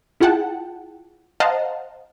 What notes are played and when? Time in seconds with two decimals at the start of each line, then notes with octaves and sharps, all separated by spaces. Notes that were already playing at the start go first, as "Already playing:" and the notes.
0.20 E4 F4 G#4 F#5 G5 A5
1.40 C5 D#5 F5 F#5 A5 A#5